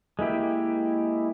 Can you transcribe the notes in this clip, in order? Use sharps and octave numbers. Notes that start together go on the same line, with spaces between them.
G#3 A#3 E4 G4